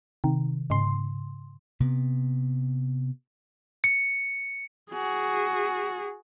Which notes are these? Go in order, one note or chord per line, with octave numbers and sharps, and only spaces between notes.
C3 D#3
G#2 C#3 C6
C3 B3
C#7
F#4 G#4